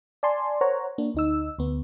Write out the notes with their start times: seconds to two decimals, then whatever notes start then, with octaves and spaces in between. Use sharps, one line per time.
0.23 D5 G#5 A5 C6
0.61 A#4 C5 C#5 F#5 A#5
0.98 A#3 D4
1.15 D2 D#4 E6
1.59 D2 B3